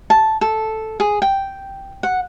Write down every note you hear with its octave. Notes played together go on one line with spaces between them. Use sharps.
A5
A4
G#4
G5
F#5